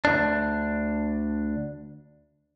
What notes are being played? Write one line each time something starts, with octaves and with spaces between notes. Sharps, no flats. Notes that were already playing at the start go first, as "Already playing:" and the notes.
D2 G2 D4